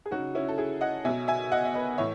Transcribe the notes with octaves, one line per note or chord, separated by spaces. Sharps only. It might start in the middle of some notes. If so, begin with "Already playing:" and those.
G#4
C#3 F#3 D#4 F#4
C#4 E4
A4
E4 G#4
D#5 F#5
B2 F#3 E5 G#5
E5 G#5
D#5 F#5
E5
B4 D#5
A2 E3 C#5 E5